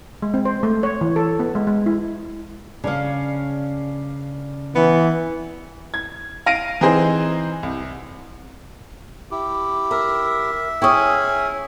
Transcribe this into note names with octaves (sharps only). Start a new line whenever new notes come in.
G#3
C4
C5
A3
C#5
E3
A4
B3
G#3
G#3
E4
C#3 C#4 D4 D5 F5
E3 B3
G#6
F5 A#6 D7 D#7
E3 C4 D#4 G#4 C5
C2
E4 G4
A#4 E5
C#4 E4 G#4 G5 C#6 D#6